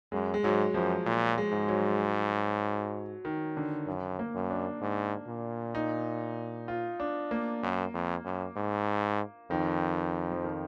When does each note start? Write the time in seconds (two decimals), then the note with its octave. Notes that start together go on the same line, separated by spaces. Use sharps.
0.12 F#2 G#3
0.34 G#3
0.43 G#2 F#3
0.74 F#2 F3
1.06 A#2
1.38 G#3
1.53 G#2
1.69 F#3
3.25 D#3
3.57 D3
3.87 F#2
4.19 A#3
4.35 F#2
4.50 D4
4.81 G#2
5.28 A#2
5.75 D#4
6.68 F4
7.00 D4
7.31 A#3
7.63 F#2
7.94 F2
8.24 F#2
8.56 G#2
9.50 F2 D#3
10.31 F3
10.44 D#3